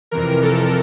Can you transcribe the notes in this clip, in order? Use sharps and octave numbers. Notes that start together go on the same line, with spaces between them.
F2 C3 E3 A#4
A4